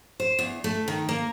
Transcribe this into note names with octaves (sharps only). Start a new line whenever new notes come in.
C5
E2
A3
D#3
A#3